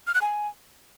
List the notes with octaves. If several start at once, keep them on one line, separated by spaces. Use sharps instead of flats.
F6
F#6
G#5